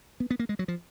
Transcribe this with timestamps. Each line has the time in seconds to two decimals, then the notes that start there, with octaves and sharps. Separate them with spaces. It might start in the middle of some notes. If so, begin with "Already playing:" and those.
0.20 B3
0.30 B3
0.39 A#3
0.49 G#3
0.59 F#3
0.68 F3